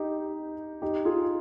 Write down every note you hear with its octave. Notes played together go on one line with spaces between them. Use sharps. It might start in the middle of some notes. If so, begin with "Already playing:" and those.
Already playing: D#4 G4
D#4 G4
F4 G#4